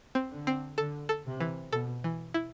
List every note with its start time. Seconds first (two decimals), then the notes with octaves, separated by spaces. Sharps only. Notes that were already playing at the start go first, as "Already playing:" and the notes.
0.15 C4
0.31 D3
0.47 C4
0.78 D3 A4
1.09 A4
1.26 C3
1.41 E3
1.72 B2 A4
2.04 E3
2.34 E4